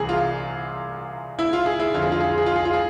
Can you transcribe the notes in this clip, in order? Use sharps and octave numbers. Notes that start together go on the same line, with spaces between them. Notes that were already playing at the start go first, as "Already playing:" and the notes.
Already playing: C2 C3 E3 G#4
F4
E4
F4
G#4
E4
F2 D3 F3 F4
G#4
F4
G#4
F4
G#4
F4
G#4
F4
G#4